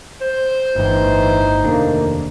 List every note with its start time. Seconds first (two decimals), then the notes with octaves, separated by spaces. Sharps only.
0.21 C5
0.76 G1 A2 E3 D#4
1.64 F1 D#2 A3 A#3 D4